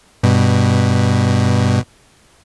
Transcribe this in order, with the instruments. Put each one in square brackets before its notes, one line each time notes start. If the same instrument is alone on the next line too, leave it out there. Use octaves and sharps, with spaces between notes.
[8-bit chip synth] G2 B2